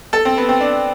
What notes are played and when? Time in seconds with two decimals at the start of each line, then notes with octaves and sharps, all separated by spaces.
0.13 A4
0.25 C4
0.38 B3
0.49 C4
0.61 D4